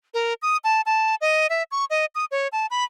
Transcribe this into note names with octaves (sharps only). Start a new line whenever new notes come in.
A#4
D#6
A5
A5
D#5
E5
C#6
D#5
D#6
C#5
A5
B5